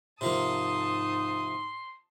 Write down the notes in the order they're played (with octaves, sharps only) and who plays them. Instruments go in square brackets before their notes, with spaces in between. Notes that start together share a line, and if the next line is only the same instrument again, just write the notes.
[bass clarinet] G#2 [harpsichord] C3 F3 A#3 [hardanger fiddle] A5 D#6 [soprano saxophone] C6